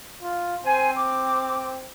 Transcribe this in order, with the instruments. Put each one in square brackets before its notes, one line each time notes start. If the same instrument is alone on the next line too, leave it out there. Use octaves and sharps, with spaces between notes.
[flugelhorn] F4
[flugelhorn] C4 [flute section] C5 G#5
[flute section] D6